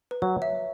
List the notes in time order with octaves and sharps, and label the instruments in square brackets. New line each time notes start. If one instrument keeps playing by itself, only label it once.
[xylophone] B4
[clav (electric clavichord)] F#3 [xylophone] C#5
[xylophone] E5